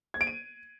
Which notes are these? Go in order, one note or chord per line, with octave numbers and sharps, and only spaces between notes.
G#6
D7
D#7